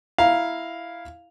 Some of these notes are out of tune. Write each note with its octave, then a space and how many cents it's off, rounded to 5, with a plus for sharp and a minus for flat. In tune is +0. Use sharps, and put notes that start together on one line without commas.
E4 +5 F5 +0 A#5 +15